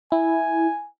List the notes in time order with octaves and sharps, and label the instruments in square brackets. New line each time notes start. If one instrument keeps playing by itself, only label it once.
[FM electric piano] E4 [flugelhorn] G#5